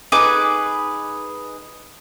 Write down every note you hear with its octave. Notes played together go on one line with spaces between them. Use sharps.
D#4 G#4 B4 D6